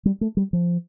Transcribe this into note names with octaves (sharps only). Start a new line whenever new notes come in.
G3
A3
G3
F3